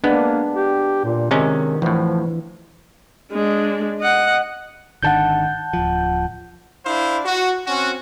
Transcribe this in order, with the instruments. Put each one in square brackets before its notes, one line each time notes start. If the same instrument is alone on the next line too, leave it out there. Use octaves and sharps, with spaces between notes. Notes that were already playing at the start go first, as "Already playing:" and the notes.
[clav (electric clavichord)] G#3 B3 [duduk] A#3 [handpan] D4
[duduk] G4
A#2
[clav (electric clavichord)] C3 G#3 C#4 [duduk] D#3
[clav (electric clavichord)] D2 A2 [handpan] E3 [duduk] F3
[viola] G#3 D4
D#5 F#5
[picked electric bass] G#1 D3 D#3 [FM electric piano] F#5 A5 G6
[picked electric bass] D1 F3
[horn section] D4 E4 C5 F5
F#4
C4 C#4 F#4